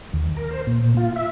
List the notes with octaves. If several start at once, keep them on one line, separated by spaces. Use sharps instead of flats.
D#2
A#4
C5
A#2
F4
E5